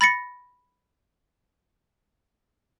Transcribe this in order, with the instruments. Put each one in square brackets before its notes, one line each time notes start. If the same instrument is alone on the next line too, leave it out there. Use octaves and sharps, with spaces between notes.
[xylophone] B5 A6 A#6 C#7